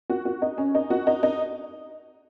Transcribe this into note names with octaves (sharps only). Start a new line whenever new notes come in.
F#4
F#4
D#4
C#4
D#4
F#4
D#4
D#4